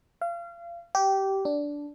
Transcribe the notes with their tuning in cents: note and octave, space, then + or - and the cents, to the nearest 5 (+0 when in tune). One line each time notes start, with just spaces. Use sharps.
F5 -30
G4 -15
D4 -10